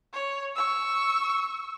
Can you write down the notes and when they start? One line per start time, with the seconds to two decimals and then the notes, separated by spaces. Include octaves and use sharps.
0.13 C#5
0.55 C#6 E6